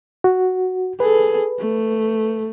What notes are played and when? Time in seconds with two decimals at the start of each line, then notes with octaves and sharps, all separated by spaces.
0.24 F#4
1.00 G#4 A4 B4
1.59 A3